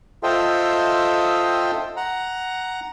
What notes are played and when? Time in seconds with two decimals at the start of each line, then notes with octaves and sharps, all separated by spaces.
0.23 F4 A4 C5 D#5 E5 G5
1.97 F#5 A#5